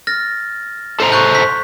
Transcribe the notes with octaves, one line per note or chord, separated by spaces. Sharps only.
F6 A6 A#6
A4 C5 A#5
C#6 F#6 G6
B6